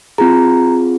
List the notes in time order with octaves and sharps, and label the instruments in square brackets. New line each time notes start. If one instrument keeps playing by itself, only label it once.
[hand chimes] C4 F4 G#4 A#5